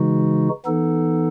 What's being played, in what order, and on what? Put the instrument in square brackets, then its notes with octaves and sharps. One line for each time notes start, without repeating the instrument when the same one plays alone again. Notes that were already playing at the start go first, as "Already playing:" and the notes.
Already playing: [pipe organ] C#3 E3 G#3 D#4 F#4
E3 B3 D#4 A4